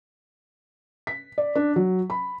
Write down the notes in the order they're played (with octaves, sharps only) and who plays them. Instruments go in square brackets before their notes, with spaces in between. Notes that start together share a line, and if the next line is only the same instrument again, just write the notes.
[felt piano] B6
D5
D4
F#3
B5